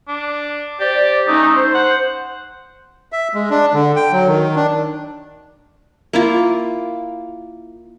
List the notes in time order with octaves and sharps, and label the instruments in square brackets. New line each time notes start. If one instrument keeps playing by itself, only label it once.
[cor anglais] D4
[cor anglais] G4 [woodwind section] C5 D5
[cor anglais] A3 [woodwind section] C#4 D#4
[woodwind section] C5
[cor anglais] F#5
[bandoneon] E5
G#3
D4
D3
G5
F#3
D#3
D4
[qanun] A#3 E4 F4